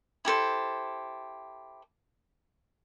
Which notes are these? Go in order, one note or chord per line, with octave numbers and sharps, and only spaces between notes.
E4 G4 A4 C5